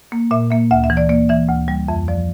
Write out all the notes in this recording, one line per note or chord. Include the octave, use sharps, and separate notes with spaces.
A#3
A#2 E5
A#3 E5
D2 E5
E5
E3
D5
A#3 D5
E3 E5
D2
G3
F2 E5
F3 D5